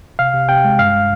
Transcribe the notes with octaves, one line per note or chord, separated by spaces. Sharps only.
C3 F5
C3
C3 G5
G#3
G2 F5